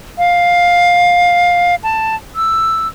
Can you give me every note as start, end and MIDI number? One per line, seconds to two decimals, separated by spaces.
0.18 1.75 77
1.84 2.15 81
2.36 2.88 88